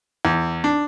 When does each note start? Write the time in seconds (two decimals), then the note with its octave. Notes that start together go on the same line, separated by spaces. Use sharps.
0.25 E2
0.64 D4